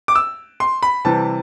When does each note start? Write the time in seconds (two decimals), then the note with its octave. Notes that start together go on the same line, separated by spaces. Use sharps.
0.08 D6
0.15 E6
0.60 C6
0.83 B5
1.05 C3 E3 G3 A5